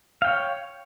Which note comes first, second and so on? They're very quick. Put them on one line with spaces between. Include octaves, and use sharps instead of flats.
F5 G5 C#5